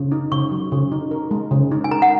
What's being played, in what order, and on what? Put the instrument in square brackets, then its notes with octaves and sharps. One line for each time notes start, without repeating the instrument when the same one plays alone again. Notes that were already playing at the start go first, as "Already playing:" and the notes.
Already playing: [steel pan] C#3
D#4
[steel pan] C#3 [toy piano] C#6
[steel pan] F#3
C#3
D#4
A#4
G#3
C#3
D#4
[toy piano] G#5
[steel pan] A#4 [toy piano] A#5
[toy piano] F#5